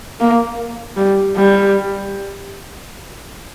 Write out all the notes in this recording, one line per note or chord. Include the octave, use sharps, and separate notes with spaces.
A#3
G3
G3